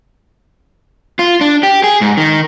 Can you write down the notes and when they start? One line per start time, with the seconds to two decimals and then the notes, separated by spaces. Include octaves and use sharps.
1.19 F4
1.41 D4
1.63 G4
1.84 G#4
2.01 G#2
2.17 D#3